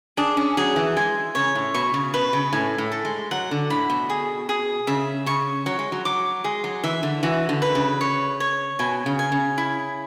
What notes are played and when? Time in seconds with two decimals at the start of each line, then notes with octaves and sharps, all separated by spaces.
0.17 D4 G#4
0.37 C#4
0.57 F#3 G#4
0.76 E3
0.97 G#3 G#5
1.35 C#3 C#5
1.55 A2
1.74 B2 C#6
1.94 C#3
2.14 B2 B4
2.33 C#3
2.53 A2 G#5
2.78 A2
2.92 A4
3.05 G#3
3.31 F#3 F#5
3.51 D3
3.70 A2 B5
3.90 B2
4.10 G#4
4.49 G#4
4.87 C#3 E5
5.26 C#3 C#6
5.66 F#3 C#5
5.79 G#3
5.92 F#3
6.05 F#3 D6
6.44 G#3 G#4
6.64 F#3
6.84 E3 E5
7.03 D3
7.23 E3 F#4
7.49 D3
7.62 B4
7.75 C#3
8.01 C#5
8.40 C#5
8.79 B2 G#5
9.06 C#3
9.19 G#5
9.32 C#3
9.58 E4